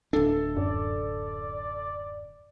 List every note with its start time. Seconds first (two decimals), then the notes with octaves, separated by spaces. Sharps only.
0.13 D1 D4 A4
0.57 F#2 D5